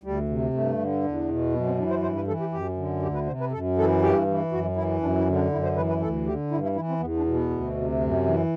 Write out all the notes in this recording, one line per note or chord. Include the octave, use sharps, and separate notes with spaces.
D2 G3
C3
G2 A3
D3
E2
B2
F#2 B3
C4
E3 D4
C5
G2 C5
B4
E3 A4
G4
F#2 G4
D3
D2 G4
B4
C3 C5
B4
F#2 A4
E3 A4
G2 G4
E3
F#2 F#4
E3 E4
F#2 D4
E4
D3
D4
F#2 E4
C5
E3 B4
B4
D2 A4
D3 G4
G2 E4
E4
E3 E4
C4
E2 B3
D4
B2
B3
D2
C3
F#2
E3